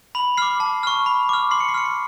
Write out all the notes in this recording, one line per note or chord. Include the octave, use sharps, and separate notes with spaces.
B5 F#7
D6 F6 C7
A5 C7
C#6 F6
B5
D6 F6
C6 C7
C#7
C7
F6 C#7
C7